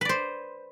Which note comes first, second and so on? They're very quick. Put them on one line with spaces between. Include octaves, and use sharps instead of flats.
B4 D5 C5